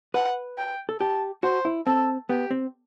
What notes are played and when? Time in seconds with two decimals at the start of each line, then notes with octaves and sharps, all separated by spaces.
0.14 B4 F#5
0.58 G5
0.89 A4
1.00 G4 A5
1.43 F#4 C5
1.65 E4
1.86 C4 A4
2.29 B3 G4
2.51 C4